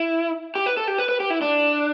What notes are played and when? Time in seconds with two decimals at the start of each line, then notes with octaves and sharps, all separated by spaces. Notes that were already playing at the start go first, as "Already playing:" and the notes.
Already playing: E4
0.55 G4
0.66 B4
0.77 A4
0.88 G4
0.98 B4
1.09 B4
1.20 G4
1.30 E4
1.42 D4